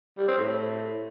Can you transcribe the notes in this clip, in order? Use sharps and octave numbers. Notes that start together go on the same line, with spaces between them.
G3
C4
A2